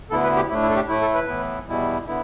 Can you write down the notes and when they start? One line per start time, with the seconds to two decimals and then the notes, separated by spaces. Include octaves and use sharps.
0.10 D2 D3 B3 E4 A4
0.23 B4
0.36 G4
0.49 A2 A3 D4 E4
0.63 E4
0.70 A4
0.76 G4
0.89 A2 A3 E4
1.01 A4
1.14 B4
1.28 A2 E3 B3 E4
1.67 E2 B2 G3 E4
2.06 D3 B3 E4